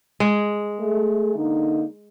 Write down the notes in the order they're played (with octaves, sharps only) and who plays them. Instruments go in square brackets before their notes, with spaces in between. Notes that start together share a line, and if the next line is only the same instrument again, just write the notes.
[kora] G#3
[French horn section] A3 G#4
D3 A#3 D#4